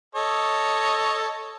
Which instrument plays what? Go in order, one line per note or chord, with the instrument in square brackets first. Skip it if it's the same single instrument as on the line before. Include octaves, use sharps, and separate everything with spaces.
[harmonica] A4 C#5 D#5